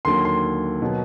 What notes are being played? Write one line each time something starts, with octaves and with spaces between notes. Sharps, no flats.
D#2 D3 F#3 C6
C6
B2 F#3